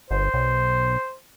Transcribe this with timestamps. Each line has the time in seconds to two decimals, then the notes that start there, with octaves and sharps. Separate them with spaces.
0.11 G1 C5
0.34 B1